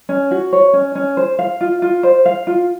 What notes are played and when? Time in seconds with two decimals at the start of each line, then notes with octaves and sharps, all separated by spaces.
0.09 C#4
0.31 F#4
0.53 C#5
0.73 C#4
0.95 C#4
1.17 C5
1.39 F5
1.61 F4
1.82 F4
2.03 C5
2.26 F5
2.47 F4